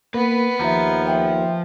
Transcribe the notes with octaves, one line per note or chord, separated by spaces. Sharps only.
A#3 B3 B4
D#2 F3 E5 A#5
E5 G5